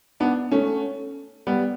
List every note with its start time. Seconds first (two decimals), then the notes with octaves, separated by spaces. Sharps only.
0.20 B3 D4
0.52 A3 C#4
1.47 G3 B3